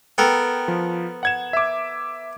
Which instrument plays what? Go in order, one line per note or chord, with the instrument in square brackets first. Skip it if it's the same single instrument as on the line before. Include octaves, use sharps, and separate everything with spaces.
[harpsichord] B3 A4 A#4 [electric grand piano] G5
[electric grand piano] F3
F#5 G#6 E7
E5 D6